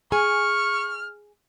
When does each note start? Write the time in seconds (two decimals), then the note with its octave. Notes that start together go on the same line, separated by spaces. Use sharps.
0.12 G#4 G#5 C#6 F6